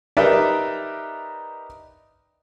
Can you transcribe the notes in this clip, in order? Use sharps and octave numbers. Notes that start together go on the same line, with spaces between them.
D#4 G4 A#4 B4 D5 E5